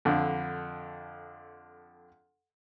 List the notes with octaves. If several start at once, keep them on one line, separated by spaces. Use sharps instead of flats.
F2 D3